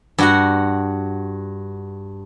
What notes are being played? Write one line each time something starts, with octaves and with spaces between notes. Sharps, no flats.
G2 F#4 F#5